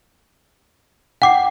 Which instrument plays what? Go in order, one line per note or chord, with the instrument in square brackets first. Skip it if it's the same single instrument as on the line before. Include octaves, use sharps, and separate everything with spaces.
[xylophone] F#5 D6 C7 [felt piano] G5